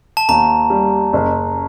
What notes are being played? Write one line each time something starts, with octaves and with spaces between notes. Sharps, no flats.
A5
D#2 A#5
G3
F#1